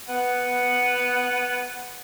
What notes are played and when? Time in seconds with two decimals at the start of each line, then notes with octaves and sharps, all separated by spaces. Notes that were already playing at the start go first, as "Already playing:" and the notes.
0.09 B3 F#5